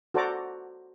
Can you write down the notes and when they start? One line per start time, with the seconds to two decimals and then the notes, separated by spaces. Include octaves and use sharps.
0.14 F#4 A4 C5 D5 A#5 D6